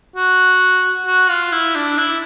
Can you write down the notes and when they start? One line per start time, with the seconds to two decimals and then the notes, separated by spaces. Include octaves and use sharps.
0.16 F#4
1.07 F#4
1.30 F4
1.52 E4
1.75 D4
1.98 E4